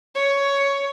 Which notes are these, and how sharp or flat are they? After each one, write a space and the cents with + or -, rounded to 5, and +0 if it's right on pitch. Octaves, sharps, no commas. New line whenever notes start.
C#5 +10